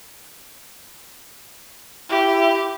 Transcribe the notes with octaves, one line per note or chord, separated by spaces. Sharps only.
E4 G4